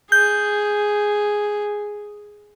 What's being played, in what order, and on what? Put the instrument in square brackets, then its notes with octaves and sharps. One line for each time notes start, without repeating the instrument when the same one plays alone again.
[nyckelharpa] G#4 [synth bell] G6